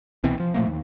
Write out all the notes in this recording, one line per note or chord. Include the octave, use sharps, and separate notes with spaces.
C2 B2 E3 C4
F3
A#2 F3 A3 A#3
D#2